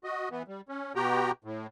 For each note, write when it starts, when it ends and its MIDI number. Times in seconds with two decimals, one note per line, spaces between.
0.04 0.29 66
0.04 0.29 75
0.31 0.43 52
0.31 0.43 59
0.48 0.61 55
0.69 0.93 61
0.96 1.31 47
0.96 1.31 59
0.96 1.31 66
0.96 1.31 67
0.96 1.31 79
0.96 1.31 82
1.44 1.67 45